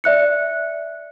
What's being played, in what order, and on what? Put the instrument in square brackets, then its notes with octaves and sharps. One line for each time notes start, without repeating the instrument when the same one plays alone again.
[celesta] D5 E5 F#6 C#7